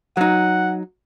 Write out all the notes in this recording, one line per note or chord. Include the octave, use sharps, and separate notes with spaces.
F#3 D#4 F#5